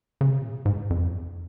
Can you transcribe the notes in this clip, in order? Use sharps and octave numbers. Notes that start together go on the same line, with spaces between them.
C#3
C3
A#2
G#2
F2